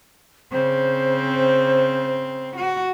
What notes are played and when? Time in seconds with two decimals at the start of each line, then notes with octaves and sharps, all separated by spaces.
0.52 C#3 C4 C5
2.56 F#4